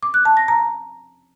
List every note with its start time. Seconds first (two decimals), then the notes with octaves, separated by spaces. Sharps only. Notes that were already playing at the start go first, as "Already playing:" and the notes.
0.03 D6
0.14 F#6
0.25 A5
0.37 A#6
0.48 A#5